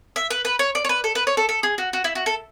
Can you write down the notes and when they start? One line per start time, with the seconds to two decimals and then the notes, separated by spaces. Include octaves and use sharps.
0.16 E5
0.30 B4
0.45 B4
0.59 C#5
0.75 D5
0.85 C#5
0.89 B4
1.04 A4
1.15 B4
1.27 C#5
1.37 A4
1.49 A4
1.63 G#4
1.78 F#4
1.93 F#4
2.04 E4
2.15 F#4
2.26 A4